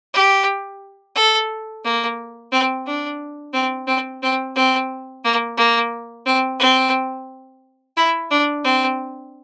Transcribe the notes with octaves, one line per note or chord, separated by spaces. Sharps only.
G4
A4
A#3
C4
D4
C4
C4
C4
C4
A#3
A#3
C4
C4
E4
D4
C4